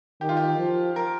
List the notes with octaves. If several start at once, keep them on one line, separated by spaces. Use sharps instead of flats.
D#3 G4
F4
G4
F3
A#4